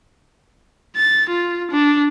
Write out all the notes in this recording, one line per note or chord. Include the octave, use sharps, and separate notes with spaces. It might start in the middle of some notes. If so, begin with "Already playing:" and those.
A6
F4
D4